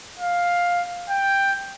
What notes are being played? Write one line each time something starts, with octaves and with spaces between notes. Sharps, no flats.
F5
G5